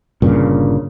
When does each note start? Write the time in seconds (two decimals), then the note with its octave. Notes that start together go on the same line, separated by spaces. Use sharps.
0.22 G1 G2 A#2 C#3